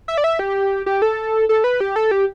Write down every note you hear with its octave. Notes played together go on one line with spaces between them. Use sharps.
E5
D5
E5
G4
G4
A4
A4
B4
G4
A4
G4